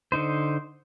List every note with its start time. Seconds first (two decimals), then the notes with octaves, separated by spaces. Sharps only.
0.12 D3 D#4 C5